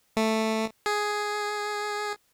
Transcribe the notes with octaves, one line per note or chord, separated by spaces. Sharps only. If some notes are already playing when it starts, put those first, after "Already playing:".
A3
G#4